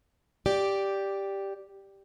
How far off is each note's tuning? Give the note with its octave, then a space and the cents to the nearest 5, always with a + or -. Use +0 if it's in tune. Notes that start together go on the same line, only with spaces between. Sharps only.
G4 +0 D5 -5